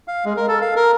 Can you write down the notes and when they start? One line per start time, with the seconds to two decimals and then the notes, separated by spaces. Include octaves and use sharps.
0.08 F5
0.25 G#3
0.37 A#4
0.48 A4
0.61 F5
0.76 A#4